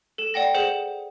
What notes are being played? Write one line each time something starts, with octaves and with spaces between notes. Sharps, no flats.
A4 E7
D5 F#5 G5 A#6
G#4 C5 F#5 E7 F#7